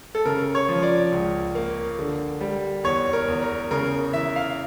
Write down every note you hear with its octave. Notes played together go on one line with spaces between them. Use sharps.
A4
C#3 A#4
C#5
F3
D5
C#2
A#3
D3
G3
E2 C#5
A#4
E2
A#4
C#3 A#4
E3 E5
F5